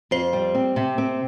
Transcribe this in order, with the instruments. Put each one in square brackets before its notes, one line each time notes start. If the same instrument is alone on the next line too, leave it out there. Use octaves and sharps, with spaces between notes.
[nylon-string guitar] F2 [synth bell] C5
[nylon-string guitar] G3
C4
C3
C4